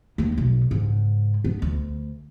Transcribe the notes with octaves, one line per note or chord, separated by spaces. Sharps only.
D#2 A#3
B1
G#2 C#3
B3
D2